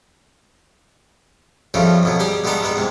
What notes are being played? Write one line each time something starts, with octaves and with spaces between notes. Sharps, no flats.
F2 C#3 F3 G3 A3
F2 B2 F#3
G3 G4 G#4
D2 G3 G#3 B3 A4 A#5
G3 G#3 B3 B4
E2 G#2 C3